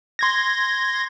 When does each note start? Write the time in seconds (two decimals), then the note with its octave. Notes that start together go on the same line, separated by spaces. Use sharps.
0.19 C6 G#6 A#6